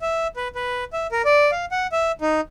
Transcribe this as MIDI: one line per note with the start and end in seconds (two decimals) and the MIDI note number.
0.01 0.27 76
0.36 0.48 71
0.55 0.84 71
0.93 1.07 76
1.12 1.22 70
1.25 1.51 74
1.52 1.65 77
1.71 1.87 78
1.92 2.12 76
2.21 2.41 63